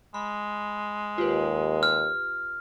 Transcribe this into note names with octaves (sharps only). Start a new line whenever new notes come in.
G#3 B5
D#2 F4 G4 B4
F6